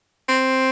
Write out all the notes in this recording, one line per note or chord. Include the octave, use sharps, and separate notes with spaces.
C4